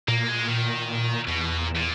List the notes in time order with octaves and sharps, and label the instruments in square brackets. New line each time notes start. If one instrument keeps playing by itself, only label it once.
[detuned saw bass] A#2 [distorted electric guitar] A#3
[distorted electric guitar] G#3
D#3
[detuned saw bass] E2 [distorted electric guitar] B2
[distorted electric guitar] A#2
A#2